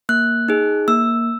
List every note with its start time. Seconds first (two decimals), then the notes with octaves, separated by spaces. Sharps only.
0.09 A#3 F#6
0.49 D#4 G#4
0.88 A#3 E6